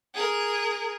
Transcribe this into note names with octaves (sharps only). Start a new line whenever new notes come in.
G#4 A#4